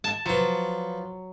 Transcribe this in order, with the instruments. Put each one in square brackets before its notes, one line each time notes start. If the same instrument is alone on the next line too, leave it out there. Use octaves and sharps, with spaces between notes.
[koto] A5
[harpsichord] F3 B4 [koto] F#3